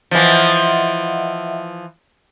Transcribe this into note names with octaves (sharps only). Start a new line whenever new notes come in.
E3 F3 D#5 E5 F#5